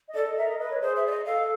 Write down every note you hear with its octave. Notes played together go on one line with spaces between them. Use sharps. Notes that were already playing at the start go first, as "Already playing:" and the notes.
D#5
A4 D5
D#5
A#4 E5
D#5
B4 D#5
C#5
G#4 C5
E5
D5
D#5
A4 F5